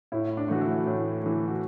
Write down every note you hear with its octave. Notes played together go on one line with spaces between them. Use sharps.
A2 E4
D4
E3 A3 F#4
E4
A2
E3 A3
F#4